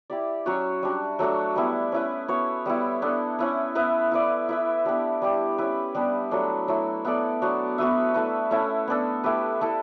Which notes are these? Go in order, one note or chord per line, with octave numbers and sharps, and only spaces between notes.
E4 G4 D5
F#3 C#4 F#4 C#5
G3 D4 F#4
F#3 A3 D4 F#4
G3 B3 E4
C#4 E4 B4
B3 F#4 C#5
G3 B3 E4
B3 D4 A4
C#4 E4 B4
B3 E4 B4 E5
E4 B4 D5
E4 B4 E5
B3 D4 G4
G3 D4 G4
C#4 E4 B4
G3 B3 D4
F#3 A3 D4
F#3 A3 E4
B3 E4 A4 D5
F#3 B3 D4 F#4
B3 F#4 B4 E5
A3 E4 B4
A3 C#4 E4
B3 D4 A4
A3 E4 G4 B4
A3 E4 A4